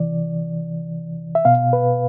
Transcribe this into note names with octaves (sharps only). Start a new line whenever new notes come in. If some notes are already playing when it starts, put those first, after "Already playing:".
Already playing: C3 E3 D5
E5
B2 F5
B4